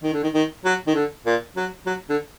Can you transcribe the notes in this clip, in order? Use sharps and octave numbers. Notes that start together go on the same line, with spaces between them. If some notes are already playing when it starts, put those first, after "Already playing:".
D#3
D3
D#3
D#3
F#3
D#3
D3
A#2
F#3
F#3
D3